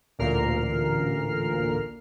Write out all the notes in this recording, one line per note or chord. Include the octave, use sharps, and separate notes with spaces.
A1 D2 A#2 A#4 F6 C7